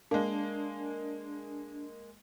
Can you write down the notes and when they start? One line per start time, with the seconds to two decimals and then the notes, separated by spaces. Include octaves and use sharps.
0.11 G#3 A#3 D4